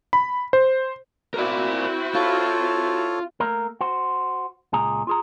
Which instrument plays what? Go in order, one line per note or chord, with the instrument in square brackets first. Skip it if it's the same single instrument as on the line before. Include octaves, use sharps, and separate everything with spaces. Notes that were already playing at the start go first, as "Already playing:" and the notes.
[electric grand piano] B5
C5
[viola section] C4 E4 F#4 [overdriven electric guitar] A#4 D5
[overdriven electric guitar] F4 [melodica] A4 C#5
[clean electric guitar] A3 A#3 A#4
F#4 C5
C#2 A#2 G#4 A#5
F4 G#4 A#5